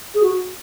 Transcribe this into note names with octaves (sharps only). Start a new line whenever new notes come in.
G#4
F#4